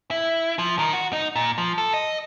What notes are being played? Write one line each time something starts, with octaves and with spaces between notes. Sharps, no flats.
E4
F3
D#3
F#4
D#4
A#2
F3
A4
D#5